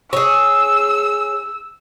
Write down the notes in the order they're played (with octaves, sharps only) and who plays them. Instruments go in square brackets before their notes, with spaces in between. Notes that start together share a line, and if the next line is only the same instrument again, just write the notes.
[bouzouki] G#4 C#5 [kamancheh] E6